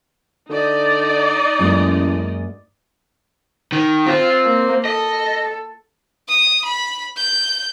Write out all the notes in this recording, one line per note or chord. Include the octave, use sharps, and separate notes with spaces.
D3 D#4 D5 D#5
A1 F#2 G#3 A#3
D#3
C4 F4
A#3
A4 D#5
D#6
B5
G6